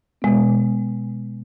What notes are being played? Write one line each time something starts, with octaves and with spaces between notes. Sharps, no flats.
B2 G#3 B3